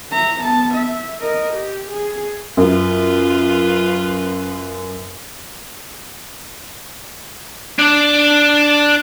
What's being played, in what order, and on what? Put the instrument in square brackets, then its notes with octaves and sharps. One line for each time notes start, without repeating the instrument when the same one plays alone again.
[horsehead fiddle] E5 A#5
B3 A5
E5
A#4 D#5
G4
G#4
[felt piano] F#2 [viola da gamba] F4 B4
[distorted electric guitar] D4 D5